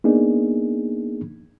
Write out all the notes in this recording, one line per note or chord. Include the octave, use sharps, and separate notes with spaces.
A#3 B3 D4 D#4 G#4